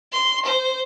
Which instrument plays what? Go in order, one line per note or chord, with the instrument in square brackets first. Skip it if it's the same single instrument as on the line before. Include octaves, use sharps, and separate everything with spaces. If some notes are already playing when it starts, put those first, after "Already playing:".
[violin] C6
C5